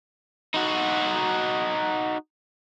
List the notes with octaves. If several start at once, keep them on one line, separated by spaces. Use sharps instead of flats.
D#4 F#4